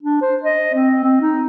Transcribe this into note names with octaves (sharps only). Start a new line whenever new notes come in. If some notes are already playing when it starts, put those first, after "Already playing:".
D4
C5
D#5
C4
C4
D#4